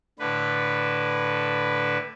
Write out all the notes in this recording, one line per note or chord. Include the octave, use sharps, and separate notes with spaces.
A2 D3 B4